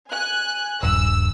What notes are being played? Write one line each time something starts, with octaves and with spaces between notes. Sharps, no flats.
G#5 F#6
D#1 G2 E6